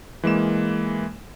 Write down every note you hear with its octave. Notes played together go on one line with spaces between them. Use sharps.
E3 G#3 A#3 E7